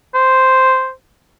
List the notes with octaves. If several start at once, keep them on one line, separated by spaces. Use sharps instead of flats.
C5